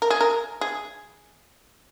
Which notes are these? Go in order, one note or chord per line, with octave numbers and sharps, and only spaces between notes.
A#4
G#4
A#4
G#4